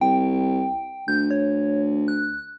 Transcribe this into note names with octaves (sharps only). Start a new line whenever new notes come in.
C2 G5
D2 G6
C#5
F#6